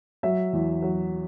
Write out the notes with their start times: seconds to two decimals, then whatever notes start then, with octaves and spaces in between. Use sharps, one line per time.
0.23 F#3 E5
0.53 E2
0.82 F#3